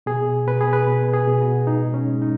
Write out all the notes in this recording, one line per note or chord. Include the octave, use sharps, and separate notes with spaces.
B2 G#4
B2 B4
G#4
B4
B2
G#4
B2
F#4
G#2 D#4
C#4
G#3
D#4